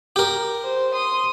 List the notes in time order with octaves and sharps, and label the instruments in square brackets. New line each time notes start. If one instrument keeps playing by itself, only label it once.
[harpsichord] G4 A#4
[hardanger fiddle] C5
C6 D#6